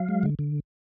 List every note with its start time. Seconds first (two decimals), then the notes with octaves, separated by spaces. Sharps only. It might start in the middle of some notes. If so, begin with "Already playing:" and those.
Already playing: F#3 F5
0.09 G#3
0.23 D3
0.39 D3